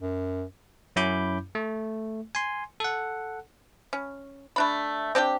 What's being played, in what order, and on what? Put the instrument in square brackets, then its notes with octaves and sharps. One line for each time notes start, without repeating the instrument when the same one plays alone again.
[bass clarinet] F#2
[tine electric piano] F#2 C#4 E4 B5 D6 G6
A3
G#5 C6
A4 F#5
[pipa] C#4
A3 D4 B5
C4 D4 G4 G5